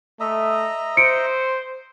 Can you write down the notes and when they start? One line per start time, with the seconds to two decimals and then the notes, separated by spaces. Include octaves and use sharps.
0.20 A3 D#5 E5 A#5
0.97 C5 C#7 D7